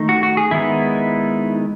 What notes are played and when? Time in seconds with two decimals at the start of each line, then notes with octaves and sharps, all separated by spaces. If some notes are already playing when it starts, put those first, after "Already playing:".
Already playing: D#3 A3 D#4
0.09 F#4
0.23 F#4
0.37 G#4
0.51 D#3 G#3 B3 D#4 E4